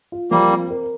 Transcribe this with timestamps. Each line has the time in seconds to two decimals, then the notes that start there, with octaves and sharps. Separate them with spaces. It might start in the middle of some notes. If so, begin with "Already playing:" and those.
0.12 F4
0.31 F3 G3 A#3
0.51 C4
0.71 A#4